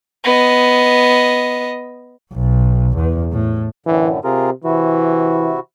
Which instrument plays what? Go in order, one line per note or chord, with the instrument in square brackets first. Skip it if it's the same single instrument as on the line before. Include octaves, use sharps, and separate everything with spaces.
[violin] B3 D#5
[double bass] B1
E2
A2
[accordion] F#2 A2 D3 [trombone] E3
[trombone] C3 [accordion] F4 G#4 A#4
[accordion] C3 E4 F#4 [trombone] E3